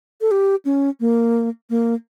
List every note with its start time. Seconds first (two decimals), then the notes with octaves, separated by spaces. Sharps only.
0.21 A4
0.31 G4
0.65 C#4
1.00 A#3
1.70 A#3